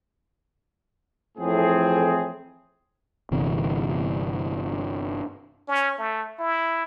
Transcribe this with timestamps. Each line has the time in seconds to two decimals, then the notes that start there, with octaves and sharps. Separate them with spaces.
1.38 F2 A2 E3 C4 G#4
3.31 G1 C3 E3
5.68 C#4
5.98 A3
6.39 E4